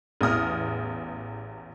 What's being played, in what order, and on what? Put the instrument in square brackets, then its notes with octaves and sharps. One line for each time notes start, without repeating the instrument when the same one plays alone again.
[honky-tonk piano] A1 E2 D#6 F6